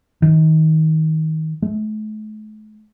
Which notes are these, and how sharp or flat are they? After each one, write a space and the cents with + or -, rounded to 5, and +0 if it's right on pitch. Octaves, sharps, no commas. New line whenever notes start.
D#3 +25
A3 -40